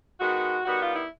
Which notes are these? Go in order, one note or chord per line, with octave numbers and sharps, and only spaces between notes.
D#3 G#3 B3 F#4
D#3 G3 B3 F#4
F4
E4